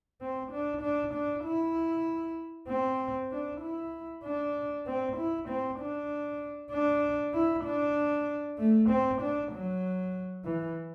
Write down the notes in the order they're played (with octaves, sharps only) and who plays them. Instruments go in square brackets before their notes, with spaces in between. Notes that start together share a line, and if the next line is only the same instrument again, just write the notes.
[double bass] C4
D4
D4
D4
E4
C4
D4
E4
D4
C4
E4
C4
D4
D4
E4
D4
A3
C4
D4
F#3
E3